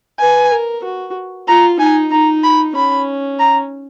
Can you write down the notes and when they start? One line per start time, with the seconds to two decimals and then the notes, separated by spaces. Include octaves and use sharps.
0.20 B4 G#5
0.51 A#4
0.84 F#4
1.48 F4 A#5
1.79 D#4 G#5
2.12 D#4 A#5
2.44 B5
2.76 C#4 B5
3.40 A#5